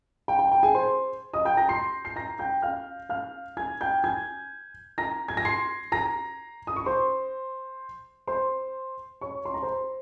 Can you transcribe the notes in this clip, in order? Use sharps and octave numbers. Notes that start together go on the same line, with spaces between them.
G5
G5
G5
G#4 G#5
C5 C6
D#5 D#6
G5 G6
A#5 A#6
C6 C7
C7
A#5 A#6
G5 G6
F5 F6
F5 F6
G#5 G#6
G5 G6
G#5 G#6
A#5 A#6
G#6
A#6
C6 C7
A#5 A#6
D#6
C#6
C5 C6
C5 C6
C#5 C#6
C6
A#5
C5 C6